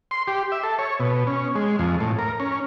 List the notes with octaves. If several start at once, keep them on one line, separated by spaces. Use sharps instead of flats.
C6
G4
E5
A4
C#5
B2
C#4
G#3
F2
A2
A#4
C#4